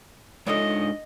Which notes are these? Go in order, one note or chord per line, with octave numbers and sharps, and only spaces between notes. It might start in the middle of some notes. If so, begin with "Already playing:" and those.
G#3 D4 D#4 F4 A4 C#5 D#5